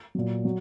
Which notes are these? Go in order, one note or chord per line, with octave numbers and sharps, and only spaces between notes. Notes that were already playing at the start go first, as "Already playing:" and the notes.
A#2 F#3
F#3